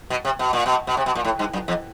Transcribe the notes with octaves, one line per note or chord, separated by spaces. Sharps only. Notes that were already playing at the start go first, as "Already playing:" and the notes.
B2
C3
B2
A#2
B2
B2
C3
B2
A#2
A2
G2
F#2
E2